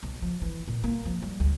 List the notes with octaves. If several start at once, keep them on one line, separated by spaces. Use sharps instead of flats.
B1
F3
E3
A#2
A#3
F3
G3
D2